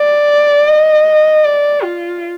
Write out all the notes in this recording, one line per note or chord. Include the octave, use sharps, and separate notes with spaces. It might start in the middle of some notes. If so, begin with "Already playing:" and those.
Already playing: D5
D#5
D5
F4